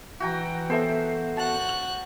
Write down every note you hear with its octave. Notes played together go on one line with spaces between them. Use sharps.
E3 F#4 G5 A#5
B3 A4 C5 E5
F#4 A5 F#6